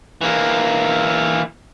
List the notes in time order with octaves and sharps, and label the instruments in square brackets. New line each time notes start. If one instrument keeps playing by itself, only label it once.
[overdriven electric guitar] E3 A#3